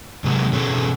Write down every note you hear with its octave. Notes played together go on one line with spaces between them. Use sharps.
C3 F#3 G#3 A#3
B2 A3 C#4 G#4